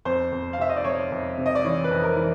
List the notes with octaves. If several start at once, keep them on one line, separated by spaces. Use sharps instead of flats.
F2 C5
F2
F5
C3 E5
D#5
D5
F2 C#5
F2
C3
D#5
D5
E3 C#5
B4
F2
A#4
E3